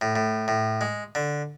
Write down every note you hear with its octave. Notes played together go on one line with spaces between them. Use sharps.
A2
A2
A2
G#3
D3